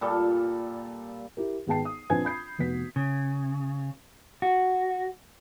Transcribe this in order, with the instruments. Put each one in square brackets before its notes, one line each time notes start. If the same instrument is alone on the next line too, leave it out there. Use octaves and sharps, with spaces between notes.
[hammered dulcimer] A#2 G3 A4
[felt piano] E4 G4 A#4
G#1 B3 G#4 G5 A5 C7
D#6
A#1 C4 D4 B4 G#5 G#6
B5 G6 C7
F1 B3 F#4 B4 B6
[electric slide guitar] C#3
F#4